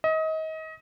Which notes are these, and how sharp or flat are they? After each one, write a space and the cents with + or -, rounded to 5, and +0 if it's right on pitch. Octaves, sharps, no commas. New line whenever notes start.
D#5 +30